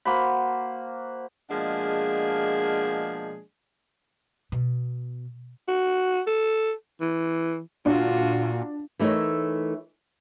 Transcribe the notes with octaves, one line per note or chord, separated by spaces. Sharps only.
A#3 F#4 C5 B5
B2 F3 G#3 A#3 D4 G#4
B2
F#4
A4
E3
A#2 D4 F4 F#4
E3 A3 D#4 A#4 C#5